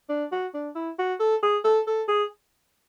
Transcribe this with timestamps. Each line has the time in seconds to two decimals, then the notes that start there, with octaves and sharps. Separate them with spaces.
0.09 D4
0.32 F#4
0.54 D4
0.75 E4
0.98 F#4
1.20 A4
1.43 G#4
1.64 A4
1.87 A4
2.08 G#4